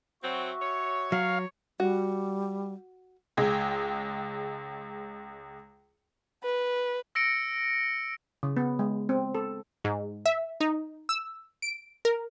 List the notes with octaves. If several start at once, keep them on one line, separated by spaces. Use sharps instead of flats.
F#3 C4 F#4 E5 C#6
C#5
F#3 F5
G3 F#4
C#2 G#3 G5 G#6
B4
E6 A#6 C#7 D7
C#3
B3
G#3
C4
A4
G#2
E5
D#4
E6
D7
A#4